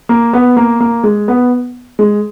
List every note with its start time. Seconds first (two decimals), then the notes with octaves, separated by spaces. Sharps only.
0.09 A#3
0.33 B3
0.57 A#3
0.80 A#3
1.03 G#3
1.28 B3
1.99 G#3